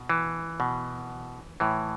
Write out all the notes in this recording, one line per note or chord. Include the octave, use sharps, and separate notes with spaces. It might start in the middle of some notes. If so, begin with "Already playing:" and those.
Already playing: B2
E3
B2
A2 E3